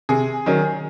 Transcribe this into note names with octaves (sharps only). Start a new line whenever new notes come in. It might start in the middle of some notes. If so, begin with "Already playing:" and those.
C3 G#4
D#3 F#3 C#4